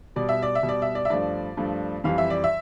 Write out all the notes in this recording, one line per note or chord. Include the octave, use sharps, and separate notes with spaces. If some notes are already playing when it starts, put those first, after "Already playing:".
B2 G3 D5
E5
D5
E5
B2 G3
D5
E5
D5
E5
G2 F3 A3 D5
G2 F3 A3
F2 E3 G3 F5
E5
D5
E5